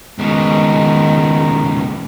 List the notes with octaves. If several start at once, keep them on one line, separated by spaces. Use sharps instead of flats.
C#2 B2 D#3 G#3